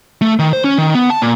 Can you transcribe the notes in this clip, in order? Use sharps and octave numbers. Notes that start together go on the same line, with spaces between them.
A3
D#3
C5
C#4
D#3
B3
A5
A#2